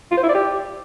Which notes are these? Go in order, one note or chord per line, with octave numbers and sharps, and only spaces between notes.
F4
C5
E4
D5
G4